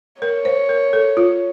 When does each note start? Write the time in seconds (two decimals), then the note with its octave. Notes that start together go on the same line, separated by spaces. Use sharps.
0.22 A#4 C#5
0.45 C5
0.69 A#4
0.93 A4
1.17 F4